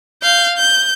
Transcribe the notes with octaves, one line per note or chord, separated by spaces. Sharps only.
F5 G6
G6